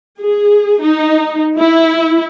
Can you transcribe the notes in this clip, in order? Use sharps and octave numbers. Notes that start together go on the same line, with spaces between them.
G#4
D#4
E4